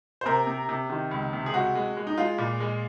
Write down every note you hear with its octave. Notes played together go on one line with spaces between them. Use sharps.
C5
C3 A#4
C3
C3
D#3
C#2
C3
G#4
G#3 F#4
G#3
G#3
D#4
G#3 F4
A#2
G#3